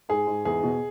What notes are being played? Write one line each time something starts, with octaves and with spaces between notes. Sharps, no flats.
G#2 G#4
G#2
E2 G#4
B2